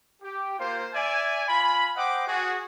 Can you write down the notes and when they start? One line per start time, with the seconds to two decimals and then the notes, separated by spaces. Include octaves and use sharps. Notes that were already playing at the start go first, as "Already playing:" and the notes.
0.22 G4
0.59 A#3 F4 C5
0.94 D5 E5 G#5
1.49 F4 G#5 B5
1.96 C5 D#5 F#5 G5 D6
2.27 F#4 G#4